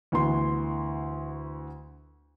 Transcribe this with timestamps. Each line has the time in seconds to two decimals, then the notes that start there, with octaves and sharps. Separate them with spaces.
0.12 D2 E3 B3 C6